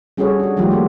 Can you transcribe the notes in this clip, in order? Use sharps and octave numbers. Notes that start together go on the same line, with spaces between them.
G3 C#4 F#4 G#4 A4 C#5
D4 F#4
D#3 F3 G3 A3 F4 G4
A3 A#3 F#4 A4